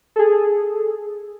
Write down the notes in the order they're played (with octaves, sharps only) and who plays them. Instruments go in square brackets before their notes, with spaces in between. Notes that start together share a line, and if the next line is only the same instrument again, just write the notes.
[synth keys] G#4 A4